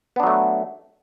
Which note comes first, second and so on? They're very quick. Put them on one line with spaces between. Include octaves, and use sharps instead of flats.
B3 D4 F#3 A3